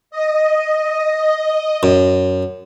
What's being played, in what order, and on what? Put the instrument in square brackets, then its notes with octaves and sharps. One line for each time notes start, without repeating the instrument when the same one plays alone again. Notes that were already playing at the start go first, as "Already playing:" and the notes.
[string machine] D#5
[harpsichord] F#2